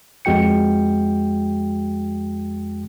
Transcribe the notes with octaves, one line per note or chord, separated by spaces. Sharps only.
F2 G#3 F#4 G5 C#7